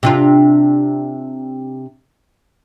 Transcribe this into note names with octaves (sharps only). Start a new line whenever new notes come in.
C3 D4 F4